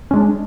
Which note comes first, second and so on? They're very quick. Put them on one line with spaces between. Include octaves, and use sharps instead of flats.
C#4 G#3 D4